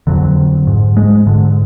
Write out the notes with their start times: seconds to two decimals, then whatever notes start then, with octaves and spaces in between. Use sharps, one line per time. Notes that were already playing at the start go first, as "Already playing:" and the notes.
0.07 F2 D3 F#3
0.67 G#2
0.97 G#3
1.27 G#2 D3